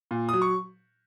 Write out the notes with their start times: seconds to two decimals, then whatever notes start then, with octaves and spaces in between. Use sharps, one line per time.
0.11 A#2
0.29 F#3 D#6
0.42 C#6